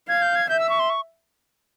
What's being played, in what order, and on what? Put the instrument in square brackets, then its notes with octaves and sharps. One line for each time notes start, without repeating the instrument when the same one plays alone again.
[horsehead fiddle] F5 [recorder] G#6
[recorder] G6
G#6
[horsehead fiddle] E5 [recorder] G6
[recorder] E6
C#6
C6
C#6